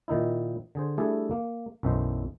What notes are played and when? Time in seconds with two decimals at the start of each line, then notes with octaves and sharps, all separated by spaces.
0.08 A#2 D#3 D#4 E4
0.75 D3 G#4 C5
0.98 G3 A3 D4 E4 G#4 A4
1.31 A#3
1.83 B1 F#2 E3 D#4 C5